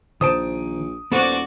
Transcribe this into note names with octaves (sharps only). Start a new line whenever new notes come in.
A#1 D#3 C5 A5 D#6 D7
D#1 B3 F#4 A4 C5 D5